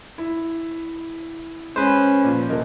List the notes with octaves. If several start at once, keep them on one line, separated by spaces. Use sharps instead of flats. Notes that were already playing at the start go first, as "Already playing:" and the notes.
E4
G#3 C#4 B4 C5
A#2 F3
D#1 A#4 D#5